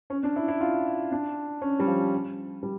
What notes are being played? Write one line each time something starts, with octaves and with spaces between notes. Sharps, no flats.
C#4
D4
E4
E4
F4
D4
C#4
G3
F3
G3